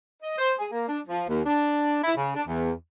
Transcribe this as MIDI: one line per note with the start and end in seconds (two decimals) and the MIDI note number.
0.23 0.35 75
0.38 0.53 72
0.59 0.69 68
0.72 0.88 58
0.88 1.00 62
1.08 1.25 53
1.29 1.42 39
1.46 2.00 62
2.04 2.13 64
2.17 2.36 49
2.36 2.43 62
2.48 2.72 40